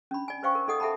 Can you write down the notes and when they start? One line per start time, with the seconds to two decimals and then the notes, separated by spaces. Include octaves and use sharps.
0.11 C#4 D4 B5
0.28 D5 G#5
0.43 B4 C5 D5 F5 G5 C#6
0.55 A#4
0.68 D#4 A4 D#5 F#5 D#6
0.80 A4 E5 F#5 G5 A5 B5